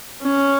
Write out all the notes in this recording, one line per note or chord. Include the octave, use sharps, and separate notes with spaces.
C#4